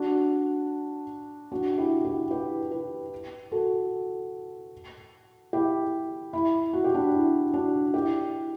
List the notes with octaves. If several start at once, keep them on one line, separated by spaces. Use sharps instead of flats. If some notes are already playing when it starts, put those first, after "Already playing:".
Already playing: D4 F#4
D4 F#4
E4 G4
E4 G4
G4 B4
G4 B4
F#4 A4
E4 G4
E4
F#4
G4
D4 F#4
E4
D4 F#4
E4 G4